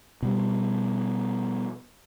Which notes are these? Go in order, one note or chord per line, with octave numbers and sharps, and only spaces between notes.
B2 G3